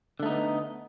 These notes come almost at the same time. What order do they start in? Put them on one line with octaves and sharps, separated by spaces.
D3 A3 D#4 B3